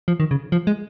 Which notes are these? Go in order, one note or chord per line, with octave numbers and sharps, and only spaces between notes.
F3
D#3
C#3
F3
G#3